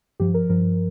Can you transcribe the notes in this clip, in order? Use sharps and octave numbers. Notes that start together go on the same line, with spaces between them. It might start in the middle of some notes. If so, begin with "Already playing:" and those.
G2 F3 G4
A#4
G2 F3 A#4